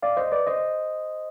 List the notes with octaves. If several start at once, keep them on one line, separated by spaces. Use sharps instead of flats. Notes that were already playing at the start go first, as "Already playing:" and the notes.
D5 F5
C5 D#5
B4 D5
C5 D#5